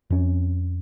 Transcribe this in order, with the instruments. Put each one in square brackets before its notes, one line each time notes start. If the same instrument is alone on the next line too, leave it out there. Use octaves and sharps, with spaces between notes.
[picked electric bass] F2 C#4